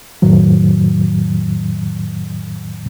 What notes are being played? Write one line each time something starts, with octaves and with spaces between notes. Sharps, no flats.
F2 A2 D#3 F#3